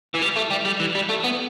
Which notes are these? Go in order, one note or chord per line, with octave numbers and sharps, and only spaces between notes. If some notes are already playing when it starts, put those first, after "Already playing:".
E3
G3
A3
G3
G3
E3
G3
A3
B3